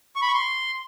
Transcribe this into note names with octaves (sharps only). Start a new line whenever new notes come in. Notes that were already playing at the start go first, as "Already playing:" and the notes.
C#6
B5
C#6
C6